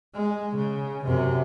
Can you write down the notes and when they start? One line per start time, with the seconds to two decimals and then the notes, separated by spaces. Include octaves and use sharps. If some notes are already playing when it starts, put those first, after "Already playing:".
0.15 G#3
0.56 C#3
1.06 F#2 C3